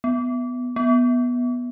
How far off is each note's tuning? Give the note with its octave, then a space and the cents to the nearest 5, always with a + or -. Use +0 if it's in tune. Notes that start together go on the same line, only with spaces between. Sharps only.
B3 +5
B3 -10